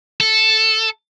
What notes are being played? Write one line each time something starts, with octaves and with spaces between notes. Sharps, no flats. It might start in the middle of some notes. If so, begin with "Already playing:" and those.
A4